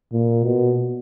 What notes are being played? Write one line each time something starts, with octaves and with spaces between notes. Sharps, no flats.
A#2
B2